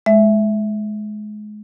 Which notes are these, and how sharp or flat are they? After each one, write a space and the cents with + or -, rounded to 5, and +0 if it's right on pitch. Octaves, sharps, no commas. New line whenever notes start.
G#3 +25 E5 +0